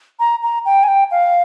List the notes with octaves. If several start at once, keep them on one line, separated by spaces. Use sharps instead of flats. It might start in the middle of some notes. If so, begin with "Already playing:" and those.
A#5
A#5
G5
G#5
G5
F5